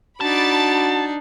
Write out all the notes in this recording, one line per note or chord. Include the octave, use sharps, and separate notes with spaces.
D4 D#4 F#4 A5 B5 D6 A6